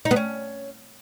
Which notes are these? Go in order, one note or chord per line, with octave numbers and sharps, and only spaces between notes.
D#4
B3
C#4